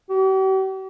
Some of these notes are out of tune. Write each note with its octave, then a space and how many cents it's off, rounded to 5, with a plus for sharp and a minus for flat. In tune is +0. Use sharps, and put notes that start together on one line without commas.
G4 -45